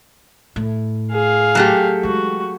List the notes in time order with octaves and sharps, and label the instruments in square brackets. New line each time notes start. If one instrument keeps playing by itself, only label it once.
[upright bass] A2
[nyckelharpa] G#4 F5
[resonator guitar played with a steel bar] F#3 A3 G4
[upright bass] E3 G#3 [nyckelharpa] F#4